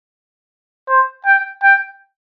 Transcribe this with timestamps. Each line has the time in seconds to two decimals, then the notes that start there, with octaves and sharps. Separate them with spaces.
0.89 C5
1.26 G5
1.63 G5